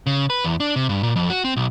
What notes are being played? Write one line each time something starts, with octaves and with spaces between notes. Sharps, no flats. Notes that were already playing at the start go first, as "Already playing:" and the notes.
C#3
B4
E2
D4
C3
G2
A#2
F2
F#4
C4
B1